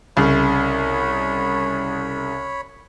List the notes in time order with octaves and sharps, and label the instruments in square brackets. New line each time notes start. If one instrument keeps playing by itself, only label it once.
[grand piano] C2 C#3 [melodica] C#5 B5